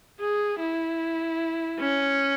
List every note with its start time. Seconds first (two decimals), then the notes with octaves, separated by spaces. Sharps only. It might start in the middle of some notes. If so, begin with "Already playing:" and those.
0.19 G#4
0.59 E4
1.79 C#4